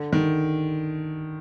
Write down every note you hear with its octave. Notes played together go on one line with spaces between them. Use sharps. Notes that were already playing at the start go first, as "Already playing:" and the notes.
Already playing: D3
D#3